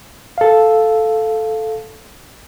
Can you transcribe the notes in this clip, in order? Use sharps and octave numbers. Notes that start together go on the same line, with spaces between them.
A4 F5